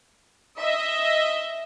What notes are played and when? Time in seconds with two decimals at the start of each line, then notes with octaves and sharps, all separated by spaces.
0.59 D#5 E5